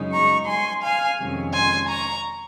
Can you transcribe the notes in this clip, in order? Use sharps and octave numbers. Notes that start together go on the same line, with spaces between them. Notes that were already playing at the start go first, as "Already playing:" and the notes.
Already playing: F#2 C#3 G#3 D#4
A#5 C#6
G#5 C6
F5 G#5
F2 C3 D#3 G#3 C#4
G#5 C6
A#5 C#6